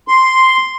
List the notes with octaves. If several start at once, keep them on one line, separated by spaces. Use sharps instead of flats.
C6